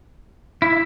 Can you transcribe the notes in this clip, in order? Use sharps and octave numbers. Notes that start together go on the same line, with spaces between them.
E4